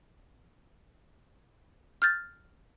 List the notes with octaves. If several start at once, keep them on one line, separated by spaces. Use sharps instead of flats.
F6 G6 A6